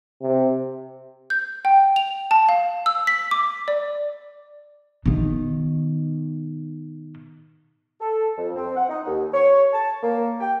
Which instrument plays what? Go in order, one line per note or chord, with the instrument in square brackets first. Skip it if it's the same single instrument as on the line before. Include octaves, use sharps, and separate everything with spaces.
[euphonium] C3
[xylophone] G6
G5
F7
A5
F5
E6
B6
D6
D5
[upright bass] B2 D#3
[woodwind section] A4
F2
C4
F#5
D#4
D#2
C#5
A5
A#3
G5